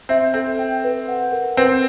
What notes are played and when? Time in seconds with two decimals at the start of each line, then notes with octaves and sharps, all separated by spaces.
0.09 C4 E5
0.34 C4 A4
0.59 G5
0.84 B4
1.08 F#5
1.32 A#4
1.57 C4 B4